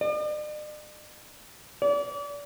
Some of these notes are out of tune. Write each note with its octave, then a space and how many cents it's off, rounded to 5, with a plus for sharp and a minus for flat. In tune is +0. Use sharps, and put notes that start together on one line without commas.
D5 +45
D5 -35